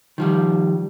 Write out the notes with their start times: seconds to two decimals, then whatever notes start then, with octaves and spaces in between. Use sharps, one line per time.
0.18 D#3 F3 G3